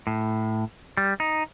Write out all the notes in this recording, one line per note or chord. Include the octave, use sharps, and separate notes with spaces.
A2
G3
D#4